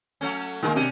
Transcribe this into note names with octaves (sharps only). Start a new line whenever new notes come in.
F#3 A3 C#4
D#3 G#3 A#3 G#4 A#4
C3 C#4 D4